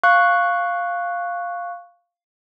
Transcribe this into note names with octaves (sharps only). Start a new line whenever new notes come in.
F5 C#6 F#6